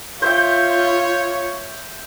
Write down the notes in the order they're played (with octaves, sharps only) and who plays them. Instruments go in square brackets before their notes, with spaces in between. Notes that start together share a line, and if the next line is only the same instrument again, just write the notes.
[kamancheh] F4 [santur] C5 E5 G5 [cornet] C#5